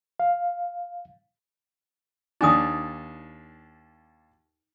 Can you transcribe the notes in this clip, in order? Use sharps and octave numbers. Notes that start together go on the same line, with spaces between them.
F5
D#2 D4 D#4 G#5 D#6